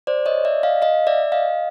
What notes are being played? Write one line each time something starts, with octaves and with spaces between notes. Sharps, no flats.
C5 D5
C#5 D#5
D5 E5
D#5 F5
D#5 F5
D5 E5
D#5 F5